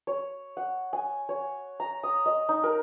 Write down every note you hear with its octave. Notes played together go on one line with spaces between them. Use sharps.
C#5
F#5
G#5
C#5
A#5
D#6
D#5
D#4
A#4